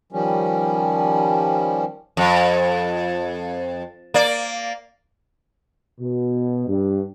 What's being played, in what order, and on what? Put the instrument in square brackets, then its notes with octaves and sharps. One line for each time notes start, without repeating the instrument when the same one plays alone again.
[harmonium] D#3 F3 G3 C#4
[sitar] F2
A#3 D5
[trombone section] B2
G2